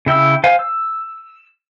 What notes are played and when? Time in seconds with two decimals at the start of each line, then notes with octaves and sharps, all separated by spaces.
0.06 C#3 E4 G5 E6
0.44 C5 F5 G#5
0.59 E6